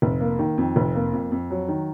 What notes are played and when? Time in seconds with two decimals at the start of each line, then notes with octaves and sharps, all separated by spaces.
0.02 F1
0.21 A#3
0.39 D#3
0.58 F2
0.76 F1
0.95 A#3
1.13 F2
1.32 F2
1.51 F#3
1.68 D#3